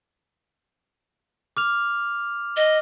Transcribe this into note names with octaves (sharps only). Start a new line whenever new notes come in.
D6 F6 F7
D#5